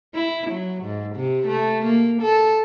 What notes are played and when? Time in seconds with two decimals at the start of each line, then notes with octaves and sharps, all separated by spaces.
0.15 E4
0.50 F#3
0.84 G#2
1.16 C3
1.48 A3
1.84 A#3
2.22 A4